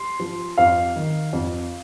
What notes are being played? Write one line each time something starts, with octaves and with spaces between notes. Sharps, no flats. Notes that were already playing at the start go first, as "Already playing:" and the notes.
Already playing: C6
F3
F2 F5
D#3
F2